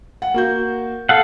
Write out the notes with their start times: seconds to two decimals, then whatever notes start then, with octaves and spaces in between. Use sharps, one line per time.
0.22 F#5
0.34 A#3 F#4 G6
1.09 A4 F5 F#5